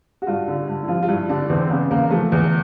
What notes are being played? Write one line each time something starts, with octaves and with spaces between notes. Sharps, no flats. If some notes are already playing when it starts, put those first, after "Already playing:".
F#4
G2 F4
D3
G2
E4
F3 F4
F4
G2 E4
D3 D4
E2 C4
C#3 B3
E2 A#3
F3 A3
E2